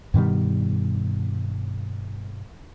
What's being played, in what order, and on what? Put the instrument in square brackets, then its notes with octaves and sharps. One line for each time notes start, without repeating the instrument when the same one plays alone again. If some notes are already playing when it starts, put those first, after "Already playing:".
[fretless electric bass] G2 B2 D#3 G3